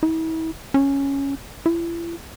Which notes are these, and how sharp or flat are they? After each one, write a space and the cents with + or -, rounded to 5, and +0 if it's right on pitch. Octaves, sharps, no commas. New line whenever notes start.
E4 -40
C#4 +0
E4 +40